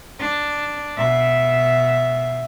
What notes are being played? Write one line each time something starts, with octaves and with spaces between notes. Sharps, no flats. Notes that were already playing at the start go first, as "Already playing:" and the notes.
D4
B2 E5